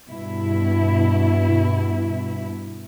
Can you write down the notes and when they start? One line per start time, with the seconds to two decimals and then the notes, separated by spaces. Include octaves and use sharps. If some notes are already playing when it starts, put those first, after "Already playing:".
0.10 G2 B2 E4